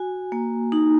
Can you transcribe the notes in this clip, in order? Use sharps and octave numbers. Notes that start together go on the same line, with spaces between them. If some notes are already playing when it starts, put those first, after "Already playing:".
Already playing: F#4 G#5
A#3
D#4